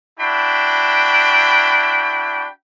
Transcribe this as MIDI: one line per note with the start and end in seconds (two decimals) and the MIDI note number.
0.19 2.47 62
0.19 2.47 64
0.19 2.47 66
0.19 2.47 79
0.19 2.47 83